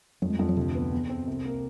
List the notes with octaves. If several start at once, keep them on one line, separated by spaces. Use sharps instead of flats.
F2 F#3
G#3
F2 G3
F#3
D2 C3
B3
E2
C4
C2
A#3